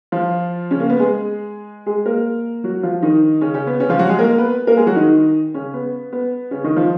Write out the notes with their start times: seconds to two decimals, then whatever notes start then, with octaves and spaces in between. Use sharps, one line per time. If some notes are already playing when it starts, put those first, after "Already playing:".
0.12 F3 F4
0.71 C#3 C#4
0.80 A#3
0.90 B3
0.99 G#3 G#4
1.86 G#3 G#4
2.06 A#3 A#4
2.64 F#3 F#4
2.83 F3 F4
3.03 D#3 D#4
3.41 C#3 C#4
3.54 C#3 C#4
3.67 B3
3.80 C#3 C#4
3.89 F3 F4
3.99 F#3 F#4
4.09 G#3 G#4
4.19 A#3 A#4
4.38 B3 B4
4.67 A#3 A#4
4.77 G#3 G#4
4.87 F#3 F#4
4.96 D#3 D#4
5.54 C#3 C#4
5.74 B3
6.12 B3
6.51 C#3 C#4
6.64 D#3 D#4
6.76 F3 F4